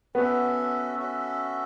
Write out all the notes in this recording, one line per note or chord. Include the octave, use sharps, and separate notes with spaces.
B3 C#4 F#4 A4 E5
C#4 F#4 A4 E5